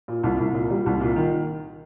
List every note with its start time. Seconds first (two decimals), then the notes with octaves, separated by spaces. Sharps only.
0.08 A#2
0.24 C2
0.40 C2
0.54 A#2
0.70 G3
0.86 C2
1.01 A#2
1.16 D#3